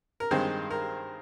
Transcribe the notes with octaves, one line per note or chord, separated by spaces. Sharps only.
A#4
G2 D#3 G#3 C4 C5
A#4